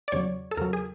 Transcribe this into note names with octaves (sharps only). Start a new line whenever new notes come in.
D5
E2 C#3 F#3 C#5
A4
E2 C#3 F#3 A#4
G#4